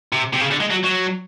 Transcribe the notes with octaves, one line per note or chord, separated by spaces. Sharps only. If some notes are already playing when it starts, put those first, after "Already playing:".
C3
C3
C#3
D3
G#3
F#3
F#3